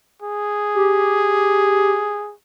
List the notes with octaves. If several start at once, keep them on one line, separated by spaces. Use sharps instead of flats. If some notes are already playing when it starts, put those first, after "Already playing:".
G#4
G4